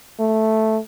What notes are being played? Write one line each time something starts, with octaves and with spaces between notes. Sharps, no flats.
A3